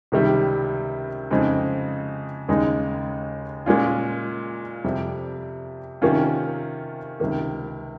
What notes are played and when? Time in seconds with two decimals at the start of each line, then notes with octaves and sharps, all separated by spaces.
0.12 C#2 C3 D#3 G3
1.31 F2 C#3 G#3 C4 D#4
2.49 D#2 C#3 G#3 D#4
3.66 A#2 G#3 C#4 F4
4.84 F2 C3 G3
6.02 C3 D#3 A#3 C#4 F4
7.20 C#2 C3 D#3 A#3